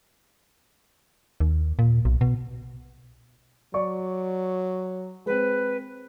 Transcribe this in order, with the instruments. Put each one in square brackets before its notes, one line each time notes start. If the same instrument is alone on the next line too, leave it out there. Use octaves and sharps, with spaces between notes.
[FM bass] D#2
A#2
B1
B2
[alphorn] F#3 [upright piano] D5 C#6
[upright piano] G#3 C4 [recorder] B4